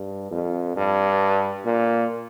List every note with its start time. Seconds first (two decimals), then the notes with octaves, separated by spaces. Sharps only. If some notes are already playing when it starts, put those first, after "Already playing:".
Already playing: G2
0.31 F2
0.76 G2
1.65 A#2